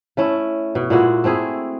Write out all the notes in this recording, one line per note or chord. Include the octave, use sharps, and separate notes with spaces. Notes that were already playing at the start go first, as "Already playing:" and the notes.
A3 C#4 E4
B2
A#2 G#3 E4 F#4
A3 C4 E4 G#4